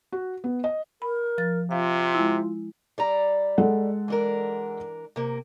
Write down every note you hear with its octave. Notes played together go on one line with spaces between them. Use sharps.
F#4
B3
D#5
A#4 B5
F3 A6
C3 F4 F5
G#3 E4
G3 D5 A#5
G#3 A4 F#5
E3 D4 A#4
C3 A#3